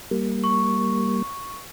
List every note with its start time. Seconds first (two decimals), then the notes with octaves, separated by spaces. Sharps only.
0.11 G3 A#3
0.44 C#6